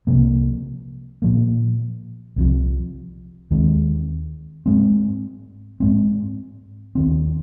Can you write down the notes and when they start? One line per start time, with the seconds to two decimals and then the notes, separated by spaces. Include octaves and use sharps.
0.07 C2 C3 F3 A#3
1.22 A#2 F3 A#3
2.36 C2 C3 F3
3.51 D#2 D#3 G#3 C4
4.66 G#2 G#3 C4
5.80 G#2 G#3 C4
6.95 D#2 D#3 C4